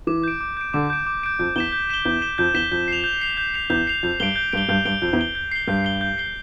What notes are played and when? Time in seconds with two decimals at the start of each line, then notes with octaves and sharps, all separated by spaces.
0.07 E3 D6
0.23 G6 D7
0.41 D6
0.57 G6 D7
0.74 D3 D6
0.90 G6 D7
1.07 D6
1.23 G6 D7
1.39 F2 G6
1.56 E2 B6 E7 G7
1.72 G6
1.89 B6 E7 G7
2.05 E2 G6
2.22 B6 E7 G7
2.38 F2 G6
2.54 E2 B6 E7 G7
2.72 F2 G6
2.88 C7 F7
3.04 G6
3.21 C7 F7
3.37 G6
3.54 C7 F7
3.70 E2 G6
3.87 C7 F7
4.03 F2 G6
4.20 G2 G7
4.23 D7
4.36 G6
4.53 G2 D7
4.57 G7
4.69 G2 G6
4.85 G2 D7 G7
5.02 F2 G6
5.13 E2
5.19 D7 G7
5.35 G6
5.52 C7 G7
5.68 G2 G6
5.85 C7 G7
6.01 G6
6.18 C7 G7